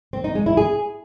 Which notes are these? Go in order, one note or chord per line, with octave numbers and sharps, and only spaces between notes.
C4
D#4
G#3
E4
G#4